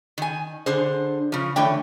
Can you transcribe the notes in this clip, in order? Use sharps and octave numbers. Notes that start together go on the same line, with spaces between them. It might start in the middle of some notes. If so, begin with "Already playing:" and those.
D#3 G#5
D3 G#4 C5
C#3 F3
D3 E3 A3 C#5 G5